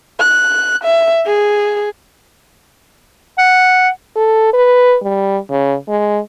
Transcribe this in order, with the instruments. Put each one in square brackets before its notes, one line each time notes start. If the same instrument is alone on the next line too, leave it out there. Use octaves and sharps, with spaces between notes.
[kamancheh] F#6
E5
G#4
[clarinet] F#5
[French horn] A4
B4
G3
C#3
G#3